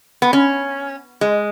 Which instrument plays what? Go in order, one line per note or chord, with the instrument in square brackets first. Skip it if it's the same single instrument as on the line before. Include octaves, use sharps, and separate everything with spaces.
[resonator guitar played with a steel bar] B3
C#4
G#3